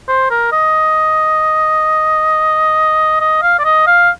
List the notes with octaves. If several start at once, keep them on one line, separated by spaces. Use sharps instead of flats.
C5
A#4
D#5
D#5
F5
D5
D#5
F5